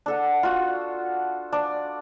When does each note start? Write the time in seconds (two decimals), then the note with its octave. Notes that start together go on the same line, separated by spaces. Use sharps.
0.06 D4 A4 F#5
0.43 F4 F#4
1.52 D4 D5